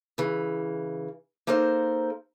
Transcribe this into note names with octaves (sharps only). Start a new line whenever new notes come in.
C#3 E3
A#3 D#4 A4 A#4 C5